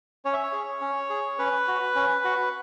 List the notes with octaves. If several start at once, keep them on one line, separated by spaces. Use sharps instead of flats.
C#4 C#5
E5
C#5
G#4
C#4
G#4
C#4 B4
F#4
C#4
F#4